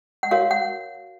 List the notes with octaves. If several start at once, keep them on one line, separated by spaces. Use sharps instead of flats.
F#5
F#4 A#4 C#5 F5
F#5